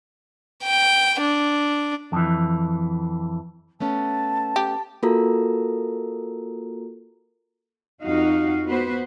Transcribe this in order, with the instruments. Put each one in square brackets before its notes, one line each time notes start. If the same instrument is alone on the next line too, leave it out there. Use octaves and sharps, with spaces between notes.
[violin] G5
D4
[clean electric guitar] F2 E3
[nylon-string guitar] A3 B3 C#4 [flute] A5
[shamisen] G4
[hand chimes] A#3 F4 F#4 A4 A#4 A#5
[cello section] F2 D#4 F#4 F5
B3 F#4 B4 C5